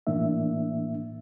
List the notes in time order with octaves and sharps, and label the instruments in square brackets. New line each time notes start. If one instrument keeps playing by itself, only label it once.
[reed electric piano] A2 E3 A#3 D4 E5